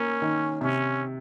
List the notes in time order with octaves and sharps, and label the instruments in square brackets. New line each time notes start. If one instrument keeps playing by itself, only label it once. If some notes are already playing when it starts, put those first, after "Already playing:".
Already playing: [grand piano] A#3 [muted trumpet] C#4
[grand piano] D#3
[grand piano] C3 [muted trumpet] C#4